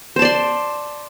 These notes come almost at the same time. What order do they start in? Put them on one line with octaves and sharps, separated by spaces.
C5 A5 D5 C6